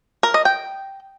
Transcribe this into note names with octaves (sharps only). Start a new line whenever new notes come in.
A#4
D#5
G5